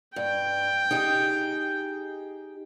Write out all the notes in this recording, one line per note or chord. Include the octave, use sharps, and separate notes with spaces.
G2 G5
D#4 G4 G#4